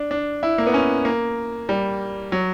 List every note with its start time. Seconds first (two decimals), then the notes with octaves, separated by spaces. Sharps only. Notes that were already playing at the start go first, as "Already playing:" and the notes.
Already playing: D4
0.11 D4
0.43 E4
0.58 A#3
0.67 B3
0.74 C#4
1.05 A#3
1.69 G3
2.32 F#3